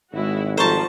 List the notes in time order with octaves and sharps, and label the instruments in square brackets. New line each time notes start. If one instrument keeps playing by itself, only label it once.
[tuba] G#1 [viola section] G#3 E4 F#4
[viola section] F3 G3 F#4 [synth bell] A4 A#5 C#6 [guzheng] C5 A5